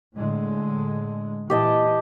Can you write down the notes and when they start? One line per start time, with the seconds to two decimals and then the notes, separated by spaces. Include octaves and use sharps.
0.15 A2 D3 G#3
1.50 A#2 E3 G4 D#5 A5